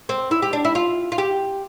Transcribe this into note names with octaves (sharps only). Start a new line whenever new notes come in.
C4
E4
G4
D4
E4
F4
F4
G4